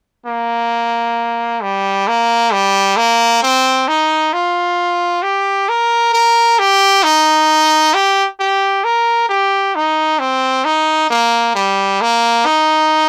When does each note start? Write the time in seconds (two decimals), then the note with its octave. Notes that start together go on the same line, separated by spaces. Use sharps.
0.26 A#3
1.62 G3
2.07 A#3
2.53 G3
2.97 A#3
3.43 C4
3.88 D#4
4.33 F4
5.22 G4
5.69 A#4
6.13 A#4
6.59 G4
7.03 D#4
7.94 G4
8.39 G4
8.84 A#4
9.29 G4
9.75 D#4
10.19 C4
10.65 D#4
11.10 A#3
11.55 G3
12.01 A#3
12.45 D#4